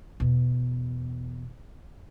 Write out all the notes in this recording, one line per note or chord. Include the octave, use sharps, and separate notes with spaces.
E2 B2